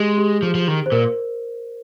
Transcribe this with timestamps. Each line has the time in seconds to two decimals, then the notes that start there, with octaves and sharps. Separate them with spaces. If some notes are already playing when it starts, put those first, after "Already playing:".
Already playing: G#3 G4
0.17 G4
0.43 F3 G#4
0.55 F3
0.68 D#3
0.86 C5
0.92 A#2 A#4